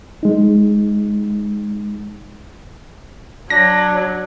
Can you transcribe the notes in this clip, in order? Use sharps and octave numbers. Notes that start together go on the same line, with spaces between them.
G#3 D#4
F#3 D4 A#6